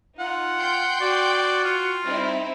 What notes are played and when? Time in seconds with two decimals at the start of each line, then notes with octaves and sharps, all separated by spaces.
0.19 D#4 F4 F#5
0.59 G5 C6 G6
1.01 F#4 D5
1.64 F4
2.05 G3 C4 D#4 E4